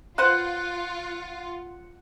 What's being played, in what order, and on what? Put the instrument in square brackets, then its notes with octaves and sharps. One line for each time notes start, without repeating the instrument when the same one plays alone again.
[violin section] F4 [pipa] B4 C5 [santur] F#5